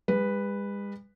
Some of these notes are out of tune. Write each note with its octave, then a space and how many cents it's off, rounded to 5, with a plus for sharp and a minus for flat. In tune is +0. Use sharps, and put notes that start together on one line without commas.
G#3 -45 B4 +0